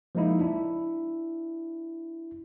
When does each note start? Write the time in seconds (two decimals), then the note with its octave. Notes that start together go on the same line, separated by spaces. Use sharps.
0.15 F3 G#3 A#3 D#4 E4
0.41 D4 E4